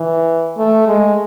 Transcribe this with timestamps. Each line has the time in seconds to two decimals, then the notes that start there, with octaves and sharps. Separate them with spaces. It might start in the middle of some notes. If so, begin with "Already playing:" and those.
Already playing: E3
0.58 A3
0.87 G#3